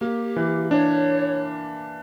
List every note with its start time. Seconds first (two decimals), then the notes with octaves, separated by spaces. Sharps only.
0.01 A#3 G4
0.36 E3
0.71 D4 C#5